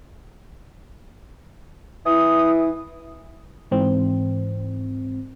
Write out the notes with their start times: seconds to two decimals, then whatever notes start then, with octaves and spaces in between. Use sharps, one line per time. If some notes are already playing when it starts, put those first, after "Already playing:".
2.06 E3 E4 D#6
3.71 G#2 E3 C4